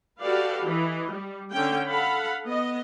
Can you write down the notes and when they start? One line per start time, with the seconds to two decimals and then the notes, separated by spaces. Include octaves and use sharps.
0.21 F#4 G4 A4 B4 D5 F5
0.67 E3 D#5
1.12 G3
1.52 D3 C#4 G5
1.90 A4 F5 F#5 B5
2.45 B3 D#5